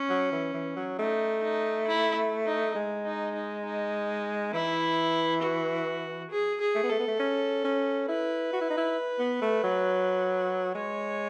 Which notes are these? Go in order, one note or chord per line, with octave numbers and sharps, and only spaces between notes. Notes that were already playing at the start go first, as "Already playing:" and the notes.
Already playing: C#4
F#3
E3
E3
F#3
A3 D#4
D#4
E4
D#4
G#3
D#4
D#4
D#4
E3 E4
F#4
G#4
G#4
A3
B3
A3 A4
B3
A3
C#4
C#4
E4 B4
F#4
E4
D#4
E4
B3
A3
F#3
G#3 C#5